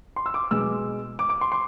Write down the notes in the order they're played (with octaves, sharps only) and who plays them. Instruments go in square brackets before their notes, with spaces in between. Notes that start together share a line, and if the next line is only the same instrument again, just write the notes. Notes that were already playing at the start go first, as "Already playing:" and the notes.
[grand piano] C6
E6
D6
B2 G#3 E6
D6
D6
C6
C6